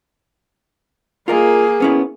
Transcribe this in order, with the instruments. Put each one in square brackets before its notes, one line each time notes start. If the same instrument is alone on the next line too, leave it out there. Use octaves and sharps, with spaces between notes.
[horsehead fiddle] A#3 G#4 [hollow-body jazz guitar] F4 A#4 D#5
[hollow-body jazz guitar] B3 C#4 E4